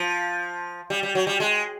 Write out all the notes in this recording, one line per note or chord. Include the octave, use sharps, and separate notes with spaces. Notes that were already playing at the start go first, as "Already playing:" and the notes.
Already playing: F3
G3
G3
F#3
G3
G#3